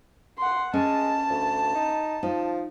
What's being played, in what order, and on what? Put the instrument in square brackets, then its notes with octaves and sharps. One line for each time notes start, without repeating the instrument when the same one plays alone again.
[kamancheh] F#5 C6
[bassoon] G#3 [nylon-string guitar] C#4 [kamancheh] A5
[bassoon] D2
D#4
[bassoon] F3 [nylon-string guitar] D#4